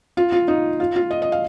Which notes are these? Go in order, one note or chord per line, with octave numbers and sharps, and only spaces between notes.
F4
F4
D#4
F4
F4
D#5
D#5
F5